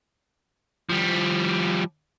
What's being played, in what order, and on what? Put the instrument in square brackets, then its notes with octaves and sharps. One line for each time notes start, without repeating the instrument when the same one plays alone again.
[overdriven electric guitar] F3 G3